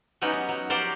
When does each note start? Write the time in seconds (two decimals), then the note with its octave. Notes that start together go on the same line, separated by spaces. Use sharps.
0.21 F#3 B3 C#4 D#4 G4
0.33 D#4
0.49 F#3
0.70 F3 F#3 G4 A#4 C5 D5